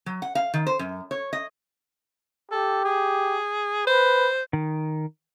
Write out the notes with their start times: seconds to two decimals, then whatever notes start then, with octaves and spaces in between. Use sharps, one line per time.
0.06 F#3
0.22 F#5
0.35 F5
0.54 D#3
0.67 C5
0.79 F#2
1.11 C#5
1.33 D#5
2.52 G4 A4
2.85 G#4
3.87 B4 C5
4.53 D#3